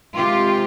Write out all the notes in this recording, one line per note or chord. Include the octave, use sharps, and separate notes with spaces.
C3 D#3 G#3 C4 F4 G4